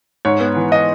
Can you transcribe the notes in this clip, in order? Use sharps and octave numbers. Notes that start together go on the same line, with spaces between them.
G#2 C#5
B3
E3
D#5